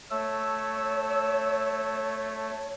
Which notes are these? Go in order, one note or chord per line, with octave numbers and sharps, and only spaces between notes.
A3 C#5 E6